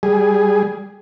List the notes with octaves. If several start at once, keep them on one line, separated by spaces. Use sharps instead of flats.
G3 G#4